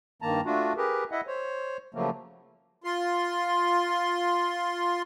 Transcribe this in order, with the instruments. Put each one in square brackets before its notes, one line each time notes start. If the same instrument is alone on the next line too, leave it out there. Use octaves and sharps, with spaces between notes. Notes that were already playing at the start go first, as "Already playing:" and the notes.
[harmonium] G2 D#3 A#3 A5 A#5
A3 D4 F4 F#4
G4 G#4 A#4 B4
E4 D#5 E5 F#5
C5 C#5
C#3 F3 F#3 A3 A#3
[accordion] F4 C6